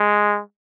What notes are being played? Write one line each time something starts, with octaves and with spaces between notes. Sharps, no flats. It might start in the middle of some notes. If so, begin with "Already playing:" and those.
Already playing: G#3